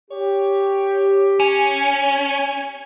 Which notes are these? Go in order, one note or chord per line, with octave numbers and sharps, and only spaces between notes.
G4 C#5
C#4 G#5